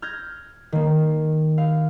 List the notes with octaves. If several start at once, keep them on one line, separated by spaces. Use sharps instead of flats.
F6 G6 G#6 A#6
D#3 A#3
F5